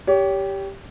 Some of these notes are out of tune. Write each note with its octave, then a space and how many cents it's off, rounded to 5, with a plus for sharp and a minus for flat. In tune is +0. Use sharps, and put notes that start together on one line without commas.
G4 +0 C#5 +30